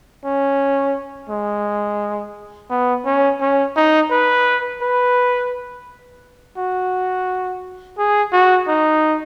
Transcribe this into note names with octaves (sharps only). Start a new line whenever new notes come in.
C#4
G#3
B3
C#4
C#4
D#4
B4
B4
F#4
G#4
F#4
D#4